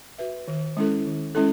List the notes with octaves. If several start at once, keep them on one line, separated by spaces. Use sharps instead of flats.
F#4 B4 E5
D#3
G#3 C#4 E4 A4
D#3
G#3 C#4 E4 A4